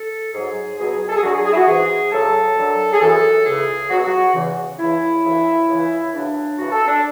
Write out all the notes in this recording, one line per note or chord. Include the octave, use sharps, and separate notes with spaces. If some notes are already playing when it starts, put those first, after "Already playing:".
Already playing: A4
G#2 F#3 G#4
C#2 B2 F#3 G#4
A4
G#4
F#2 D3 F#3 F#4
G#4
G#4
E4
F#4
G#2 E3 G#4
D2 C#3 F#3 A4
F#2 D3 F#3
G#4
F#2 E3 A4
C#2 C#3 E3 G#4
C#2 B2 F#3 F#4
G#4
F#4
E2 C#3 E3
E2 C#3 E3 E4
D2 C#3 E3
C#2 C#3 E3
F#2 C#3 E3 D4
F#2 C#3 E3 F#4
A4
D4